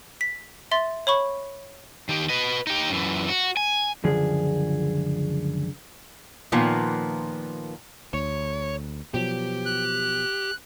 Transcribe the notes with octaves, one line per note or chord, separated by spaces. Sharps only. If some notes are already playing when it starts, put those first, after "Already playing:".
B6
E5 C6 A6
C#5 B5 C#6
D#3 G4
B4 D#5
D#4 G4
F#2 E3
F#4
G#5
C#2 F#2 D3 F3 G#4
A#2 D#3 F3 A#3 B3
D2 C#5
B2 F3 F#3 G4
F#6